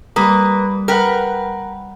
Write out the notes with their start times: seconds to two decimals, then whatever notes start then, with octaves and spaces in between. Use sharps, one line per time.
0.16 G3 A#3 B4 D#6
0.88 A#4 B4 F#5 G5